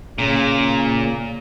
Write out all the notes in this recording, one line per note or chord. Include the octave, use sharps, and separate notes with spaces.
A#2 C#3